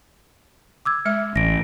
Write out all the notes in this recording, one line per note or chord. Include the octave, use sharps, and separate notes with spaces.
D6 E6 G#6
G#3 E5
A1 A#6 D7